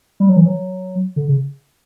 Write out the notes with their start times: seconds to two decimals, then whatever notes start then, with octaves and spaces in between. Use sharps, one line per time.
0.20 G3
0.29 F#3
0.37 E3
0.46 F#3
1.16 D3
1.28 C#3